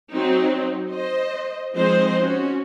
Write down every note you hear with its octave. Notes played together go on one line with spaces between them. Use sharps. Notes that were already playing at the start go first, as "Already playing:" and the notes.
F#3 C4 D#4
C5 D#5
F3 G#3 C4 D#4 C5 D#5
C#4 F#4